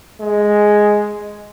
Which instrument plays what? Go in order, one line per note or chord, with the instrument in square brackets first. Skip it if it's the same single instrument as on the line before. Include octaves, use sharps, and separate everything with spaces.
[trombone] G#3